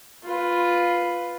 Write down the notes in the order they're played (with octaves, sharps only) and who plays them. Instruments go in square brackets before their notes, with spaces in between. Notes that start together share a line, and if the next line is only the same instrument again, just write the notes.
[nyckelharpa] F4 B4